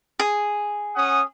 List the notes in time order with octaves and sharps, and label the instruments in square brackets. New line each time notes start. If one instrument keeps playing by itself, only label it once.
[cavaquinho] G#4
[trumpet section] C#4 F#5 D#6